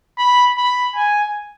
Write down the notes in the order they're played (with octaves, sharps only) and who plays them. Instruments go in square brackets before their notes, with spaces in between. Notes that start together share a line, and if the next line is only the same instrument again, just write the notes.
[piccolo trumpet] B5
B5
G#5